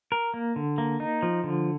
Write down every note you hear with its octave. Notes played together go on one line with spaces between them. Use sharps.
A#4
A#3
D3
A#3
D#4
F3
D3